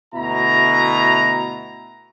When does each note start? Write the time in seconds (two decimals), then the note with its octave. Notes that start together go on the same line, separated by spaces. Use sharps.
0.15 D2 B2 E4 A#5